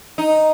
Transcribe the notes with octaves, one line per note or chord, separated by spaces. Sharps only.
D#4